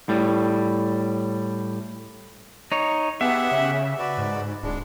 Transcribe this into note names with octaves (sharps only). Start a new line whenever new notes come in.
A2 G3
D#4 C#5
B3 G4 G#4 E5 F#5
C#3
F#4 B4 D5
G#2
D1 G#3 D4